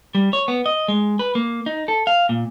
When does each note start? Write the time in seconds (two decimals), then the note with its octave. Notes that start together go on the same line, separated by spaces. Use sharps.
0.15 G3
0.33 C#5
0.48 B3
0.66 D#5
0.88 G#3
1.19 B4
1.35 A#3
1.66 D#4
1.88 A4
2.07 F5
2.29 A#2